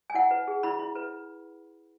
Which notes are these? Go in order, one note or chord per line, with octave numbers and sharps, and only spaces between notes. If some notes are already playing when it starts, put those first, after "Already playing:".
G#5
E4 F#5
B4
G#4
E4 B5
E4
B4